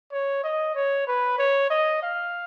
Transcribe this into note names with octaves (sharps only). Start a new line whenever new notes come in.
C#5
D#5
C#5
B4
C#5
D#5
F5